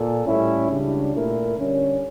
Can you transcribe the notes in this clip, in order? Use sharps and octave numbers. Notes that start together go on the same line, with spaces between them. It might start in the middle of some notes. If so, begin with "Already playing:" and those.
Already playing: A#2 A4
A2 G3 C#4 E4
C#2 C#3 G3 D4
A#2 A3 E4 A#4
D3 G3 C#4